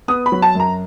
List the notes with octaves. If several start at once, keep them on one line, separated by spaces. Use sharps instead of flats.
B3 D#6
B5
F#3
A5
F#2 A#5